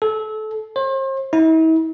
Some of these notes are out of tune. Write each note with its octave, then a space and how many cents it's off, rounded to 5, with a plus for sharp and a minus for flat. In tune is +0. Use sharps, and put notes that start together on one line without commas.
A4 -25
C5 +40
E4 -45